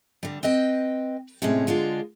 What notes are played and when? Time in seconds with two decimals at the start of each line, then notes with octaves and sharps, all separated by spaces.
0.23 D3 G3
0.43 C4 B4 D#5 G5
1.42 A2 C3 G#3 C#4
1.67 D3 G#3 D4 F4